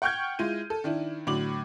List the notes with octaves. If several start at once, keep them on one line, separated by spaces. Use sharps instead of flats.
F#5 G5 C#6 F6 G6 G#6
G#3 E4 F4 D#7
A4
D#3 D4 E4
A2 D3 F#3 D6 F#7